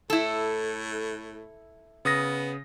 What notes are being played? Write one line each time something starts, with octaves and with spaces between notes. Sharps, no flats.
A2 E4 A4
C#3 B3 D#6 A#6